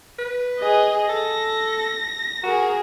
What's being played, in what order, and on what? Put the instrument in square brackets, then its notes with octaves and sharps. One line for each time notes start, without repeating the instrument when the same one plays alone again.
[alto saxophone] B4
[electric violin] G#4 D#5
[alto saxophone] A4 [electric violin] A#6
[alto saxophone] F#4 [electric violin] G#4 A#4